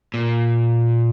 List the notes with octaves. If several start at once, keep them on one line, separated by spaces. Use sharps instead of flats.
A#2